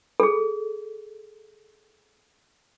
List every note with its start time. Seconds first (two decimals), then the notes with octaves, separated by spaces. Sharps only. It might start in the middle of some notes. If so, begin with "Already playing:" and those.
0.20 G#4 A4